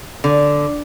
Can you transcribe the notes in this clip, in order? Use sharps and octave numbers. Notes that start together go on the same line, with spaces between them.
D3